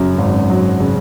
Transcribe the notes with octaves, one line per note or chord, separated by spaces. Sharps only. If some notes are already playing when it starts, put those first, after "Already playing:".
Already playing: F#2 C#3
G#1
F#3
C#3